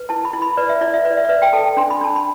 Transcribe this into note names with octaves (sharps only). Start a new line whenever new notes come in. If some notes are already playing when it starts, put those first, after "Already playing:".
Already playing: B4
E4 A5
B5
E4
B5
B4 D5
E5
E4 D5
E5
B4 D5
E5
D5
B4 E5
G5
A4 A5
D4 C6
B5
D4 A5
B5